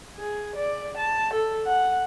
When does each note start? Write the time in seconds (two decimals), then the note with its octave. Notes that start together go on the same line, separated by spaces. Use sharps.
0.16 G#4
0.56 D5
0.98 A5
1.34 A4
1.67 F#5